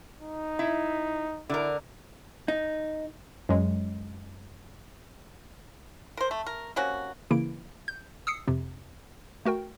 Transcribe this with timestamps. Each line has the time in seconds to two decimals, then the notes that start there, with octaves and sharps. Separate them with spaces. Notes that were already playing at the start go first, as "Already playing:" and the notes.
0.21 D#4
0.59 E4
1.50 D3 E4 A#4
2.48 D#4
3.49 F#2 F#3 G#3
6.17 A#4 C5
6.31 A3
6.47 A#4
6.76 C3 A#3 C#4 F#4
7.30 C#3 E3 A#3 E4 D7
7.88 G6
8.27 D#6 E6 C7 C#7
8.48 F2 C3
9.45 A3 F#4 A#4 G5